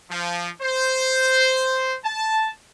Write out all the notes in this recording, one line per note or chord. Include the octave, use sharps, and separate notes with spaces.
F3
C5
A5